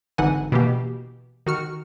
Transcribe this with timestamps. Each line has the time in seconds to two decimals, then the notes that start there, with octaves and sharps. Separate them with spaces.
0.18 G#1 D3 E3 D#4 F#5 G#5
0.52 B2 E3 A#3 G4
1.46 D#3 F#4 F6 C#7